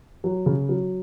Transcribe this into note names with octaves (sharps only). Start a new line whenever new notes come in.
F#3
C#3
F#3